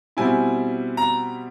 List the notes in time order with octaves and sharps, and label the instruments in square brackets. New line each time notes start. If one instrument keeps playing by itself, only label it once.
[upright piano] B2 G3 C4 E4 G#5
A#5